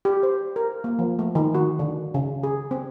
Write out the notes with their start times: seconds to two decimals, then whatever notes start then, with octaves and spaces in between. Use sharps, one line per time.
0.05 G4
0.23 C5
0.56 A#4
0.84 A#3
0.99 F3
1.19 A3
1.35 D#3
1.55 F#4
1.79 D3
2.14 C#3
2.43 G#4
2.71 C4